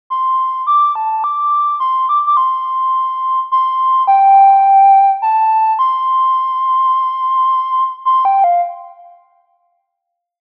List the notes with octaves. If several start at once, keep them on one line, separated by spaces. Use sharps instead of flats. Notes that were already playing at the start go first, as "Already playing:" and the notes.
C6
D6
A5
D6
C6
D6
D6
C6
C6
G5
A5
C6
C6
G5
F5